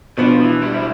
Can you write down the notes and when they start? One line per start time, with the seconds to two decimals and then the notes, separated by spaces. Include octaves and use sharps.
0.18 B2 F3 B3 D4
0.40 E3
0.62 G3
0.74 E4